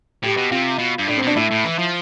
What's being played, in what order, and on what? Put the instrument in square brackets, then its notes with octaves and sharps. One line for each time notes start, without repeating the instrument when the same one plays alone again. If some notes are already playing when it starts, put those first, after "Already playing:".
[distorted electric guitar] A2 [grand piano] G4
[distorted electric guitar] B2
[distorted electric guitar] C3 [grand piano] F4
[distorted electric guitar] B2
G2
[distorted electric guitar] A2 [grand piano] D4
[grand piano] C4
[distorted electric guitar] B2 [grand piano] D4
[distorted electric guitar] A2 [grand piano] E4
[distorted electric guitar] A2
E3
F3